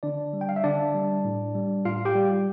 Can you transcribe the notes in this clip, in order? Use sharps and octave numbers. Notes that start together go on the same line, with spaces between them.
D3 D4 D5
G3
G5
F5
E5
D3 D4 D5
G3
A2
G3
A2 F4 F5
G4 G5
G3